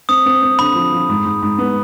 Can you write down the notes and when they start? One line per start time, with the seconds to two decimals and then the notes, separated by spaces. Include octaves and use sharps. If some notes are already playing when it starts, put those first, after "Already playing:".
0.09 C4 D#6
0.26 C4
0.42 C4
0.59 D3 B5
0.75 F3
0.92 F3
1.09 G#2
1.25 G#2
1.42 G#2
1.59 B3